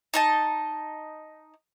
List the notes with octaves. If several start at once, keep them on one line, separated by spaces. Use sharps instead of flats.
D#4 D#5 A5